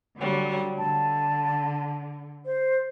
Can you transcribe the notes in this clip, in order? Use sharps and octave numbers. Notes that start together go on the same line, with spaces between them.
D3 F#3 G3
D3 A5
C5